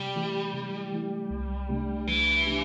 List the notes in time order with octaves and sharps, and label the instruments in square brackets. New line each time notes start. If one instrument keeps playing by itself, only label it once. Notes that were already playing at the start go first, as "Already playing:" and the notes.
Already playing: [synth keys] C3 [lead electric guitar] G3
[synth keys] E3 A3 E4 G4
C3
E3 A3 E4 G4
C2
C3 A3 D4 G4
[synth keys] C2 [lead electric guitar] E3
[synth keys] C3 A3 D4 G4